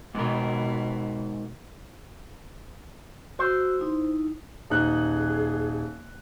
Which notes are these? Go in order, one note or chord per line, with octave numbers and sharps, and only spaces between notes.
G#2 B2 A#4
F#4 C5 E6
D#4 E4
D#1 D#4 G#4 F#6